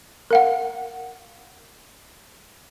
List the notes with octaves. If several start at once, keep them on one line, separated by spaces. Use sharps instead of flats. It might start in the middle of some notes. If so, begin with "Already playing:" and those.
A#4 F5 F#5